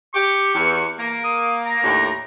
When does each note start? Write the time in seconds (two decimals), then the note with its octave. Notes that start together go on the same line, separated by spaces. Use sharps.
0.14 G4 C#6
0.55 E2
0.99 A#3 A#4
1.24 D#6
1.66 A#5
1.82 D#2 A2 D4